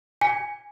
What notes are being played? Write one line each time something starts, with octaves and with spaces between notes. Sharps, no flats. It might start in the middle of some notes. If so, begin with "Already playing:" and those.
G#5